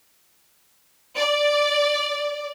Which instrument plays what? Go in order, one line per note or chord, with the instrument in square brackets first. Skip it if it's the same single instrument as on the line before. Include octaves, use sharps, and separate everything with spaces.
[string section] D5